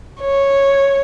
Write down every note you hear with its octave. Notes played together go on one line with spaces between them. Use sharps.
C#5